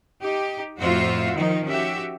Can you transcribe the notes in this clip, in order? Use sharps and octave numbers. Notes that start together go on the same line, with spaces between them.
D#4 G4
F2 A2 F4 F#4 C5 E5
D#3 F3 D#4
C#4 F#4 G4 E5